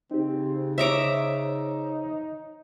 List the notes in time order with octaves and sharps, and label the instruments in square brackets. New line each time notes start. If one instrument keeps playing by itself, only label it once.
[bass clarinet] C#3 [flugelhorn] C4 [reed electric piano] D#4 G4
[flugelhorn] D#4 [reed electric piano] C5 C#5 D#6 [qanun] E5 A#5 D6